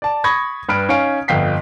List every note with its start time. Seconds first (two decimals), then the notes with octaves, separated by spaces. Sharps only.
0.02 D5 A5
0.24 B5 C#6 D#6 G#6 A#6
0.69 G2 B4 B5 F6 D7
0.89 C#4 D#4 C#5 F5 D7
1.28 G1 F2 F5 G5 B6 C7